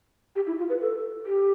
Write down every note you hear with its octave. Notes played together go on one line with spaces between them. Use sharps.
G4
E4
F4
B4
A4
G4